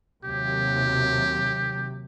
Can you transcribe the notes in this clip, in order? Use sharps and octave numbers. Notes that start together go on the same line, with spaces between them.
D#2 C3 F#3 G4